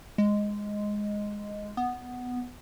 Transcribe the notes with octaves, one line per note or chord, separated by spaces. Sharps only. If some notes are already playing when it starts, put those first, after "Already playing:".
G#3
B3